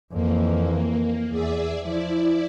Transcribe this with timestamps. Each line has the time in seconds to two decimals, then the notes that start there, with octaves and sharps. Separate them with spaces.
0.13 F2 E3 A#3
1.29 E2 G#4 D5 E5
1.81 F3 E4 D5